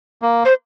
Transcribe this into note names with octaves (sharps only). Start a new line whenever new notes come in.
A#3
C5